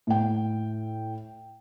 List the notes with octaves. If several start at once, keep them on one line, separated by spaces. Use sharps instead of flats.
A2 G5